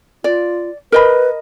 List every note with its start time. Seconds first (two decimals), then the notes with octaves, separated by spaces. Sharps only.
0.24 F4 D5
0.92 A#4 B4 D#5 B5